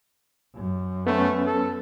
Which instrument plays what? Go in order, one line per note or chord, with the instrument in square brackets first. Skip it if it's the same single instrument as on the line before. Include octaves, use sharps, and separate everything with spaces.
[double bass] F#2
[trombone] A3 [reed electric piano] B3 C#4
[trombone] A4